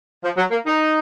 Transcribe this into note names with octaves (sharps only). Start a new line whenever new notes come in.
F3
F#3
A#3
D#4